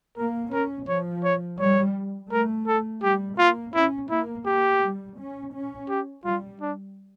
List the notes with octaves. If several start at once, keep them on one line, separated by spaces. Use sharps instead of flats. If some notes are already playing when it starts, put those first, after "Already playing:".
A#3 A#4
C#4 A#4
F3 C#5
C#5
G3 C#5
A3 A#4
A4
G3 G4
A#3 F4
C#4 E4
A#3 E4
A#3 G4
G3
C#4
C#4
G4
G3 F4
D4